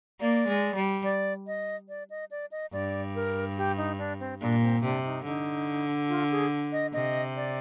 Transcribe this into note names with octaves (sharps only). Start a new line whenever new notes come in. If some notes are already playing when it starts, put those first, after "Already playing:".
A#3 D5
G#3
G3
D5
D#5
D5
D#5
D5
D#5
G2 D5
A#4
G4
D#4
D4
C4
A#2 D4
C4
C3 D4
D#4
D3 D#4
F4
G#4
D#5
C3 D#5
D5